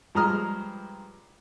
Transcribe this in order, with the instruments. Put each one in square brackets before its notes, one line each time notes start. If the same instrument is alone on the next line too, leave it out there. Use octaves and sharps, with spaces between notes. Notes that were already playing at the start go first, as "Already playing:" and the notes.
[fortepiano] G2 F3 G#3 A#5 D#6 F6